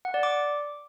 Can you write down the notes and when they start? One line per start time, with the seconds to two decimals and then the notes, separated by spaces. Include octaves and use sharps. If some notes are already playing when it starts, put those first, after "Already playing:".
0.05 F#5
0.14 D5
0.23 D6